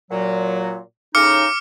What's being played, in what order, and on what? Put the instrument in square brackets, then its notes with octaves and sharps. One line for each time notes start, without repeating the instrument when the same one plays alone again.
[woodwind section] A#2 F#3
[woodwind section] A2 C#3 D#4 [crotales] D6 F6 C#7